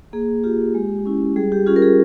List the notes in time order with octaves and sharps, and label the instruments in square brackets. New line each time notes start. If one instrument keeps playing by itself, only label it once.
[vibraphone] A#3 G#4
F4 G4
G#3
C#4 E4
G3 G#4
G4
C#4 F4 G#4
A#4
G#4